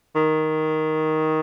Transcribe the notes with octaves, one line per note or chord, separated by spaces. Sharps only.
D#3